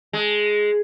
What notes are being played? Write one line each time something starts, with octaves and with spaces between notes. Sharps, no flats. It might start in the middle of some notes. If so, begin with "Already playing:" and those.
G#3